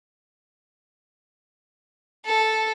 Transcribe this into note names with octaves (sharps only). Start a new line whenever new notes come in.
A4